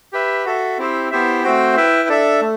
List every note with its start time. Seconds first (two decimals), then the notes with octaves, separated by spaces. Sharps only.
0.13 G4 B4 E5
0.45 F#4 A4 E5
0.78 C4 E4 G4 C5
1.11 B3 E4 G4 C5 E5
1.43 A3 C4 F#4 C5 G5
1.77 E4 B4 E5 G5
2.09 D4 A4 E5
2.41 A3